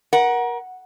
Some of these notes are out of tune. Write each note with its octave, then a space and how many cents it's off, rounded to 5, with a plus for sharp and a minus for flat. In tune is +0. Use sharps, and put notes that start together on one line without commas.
A#4 +30 F#5 +0